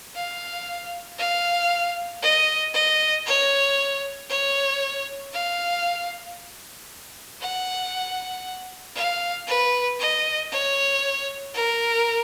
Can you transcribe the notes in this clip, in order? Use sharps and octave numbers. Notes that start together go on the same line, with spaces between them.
F5
F5
D#5
D#5
C#5
C#5
F5
F#5
F5
B4
D#5
C#5
A#4